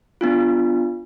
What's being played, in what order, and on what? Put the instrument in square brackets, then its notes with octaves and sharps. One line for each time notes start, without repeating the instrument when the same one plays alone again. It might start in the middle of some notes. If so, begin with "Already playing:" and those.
[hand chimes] B3 D4 F4